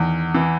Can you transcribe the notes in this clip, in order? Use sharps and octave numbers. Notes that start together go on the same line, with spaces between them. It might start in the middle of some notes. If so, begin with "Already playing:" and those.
Already playing: E2 D#3
E3